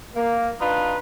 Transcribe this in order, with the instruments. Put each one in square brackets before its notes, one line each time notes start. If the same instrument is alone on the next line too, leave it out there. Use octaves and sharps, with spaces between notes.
[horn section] A#3
D4 D#4 F4 B4